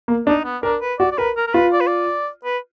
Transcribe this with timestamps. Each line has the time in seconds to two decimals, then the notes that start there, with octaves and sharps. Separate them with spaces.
0.08 A#3
0.27 D4 D#4
0.44 B3
0.63 D4 A#4
0.81 B4
0.99 F#4 D5
1.12 D5
1.18 A#4 B4
1.37 A#4
1.47 A#4
1.54 F4 B4
1.73 D5
1.80 B4
1.87 D5
2.45 B4